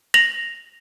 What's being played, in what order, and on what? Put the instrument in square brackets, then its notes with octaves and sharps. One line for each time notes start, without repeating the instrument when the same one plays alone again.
[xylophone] A#6 F7 F#7